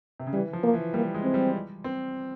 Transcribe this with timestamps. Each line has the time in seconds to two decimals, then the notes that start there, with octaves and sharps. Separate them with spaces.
0.20 C3
0.27 C#3
0.33 E3 G3
0.53 F3
0.63 A#3
0.74 E3
0.94 G3 A#3
1.14 G#3
1.24 C4
1.34 G3
1.84 C4